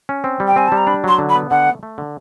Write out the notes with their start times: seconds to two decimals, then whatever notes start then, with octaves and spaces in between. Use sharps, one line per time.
0.09 C#4
0.24 C4
0.40 G3
0.47 G5
0.56 C4 G#5
0.68 G3 A5
0.77 A#5
0.87 D4 B5
1.04 F#3 C6
1.18 D3
1.30 B5
1.35 B3
1.51 D3 F#5
1.66 A3
1.83 A3
1.98 D3